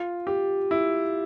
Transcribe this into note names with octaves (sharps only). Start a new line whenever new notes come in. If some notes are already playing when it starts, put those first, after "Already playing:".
Already playing: F4
G4
E4